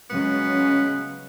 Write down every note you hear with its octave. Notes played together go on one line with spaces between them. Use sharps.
C#3 F#3 G#3 B3